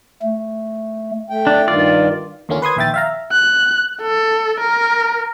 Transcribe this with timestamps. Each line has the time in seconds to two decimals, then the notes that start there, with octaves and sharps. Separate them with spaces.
0.22 A3
1.30 A3 G5
1.47 D4
1.68 G2 D#3 F4 D5
2.49 D#2 D3 A#3 C#4 F4
2.62 B4 C6 D#6 G#6
2.76 A#1 D#2 E5 G5 A6
2.94 E5 F5 A#5
3.32 F#6
4.02 A4
4.60 A#4